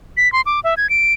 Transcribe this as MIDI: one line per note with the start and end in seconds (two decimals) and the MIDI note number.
0.17 0.31 95
0.33 0.41 84
0.46 0.60 86
0.64 0.74 76
0.77 0.89 92
0.90 1.13 98